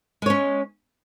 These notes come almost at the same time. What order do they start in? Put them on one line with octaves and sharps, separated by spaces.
G#3 C#5 C#4